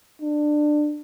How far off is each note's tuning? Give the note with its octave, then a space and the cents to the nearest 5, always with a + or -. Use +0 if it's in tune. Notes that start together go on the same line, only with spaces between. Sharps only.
D4 +20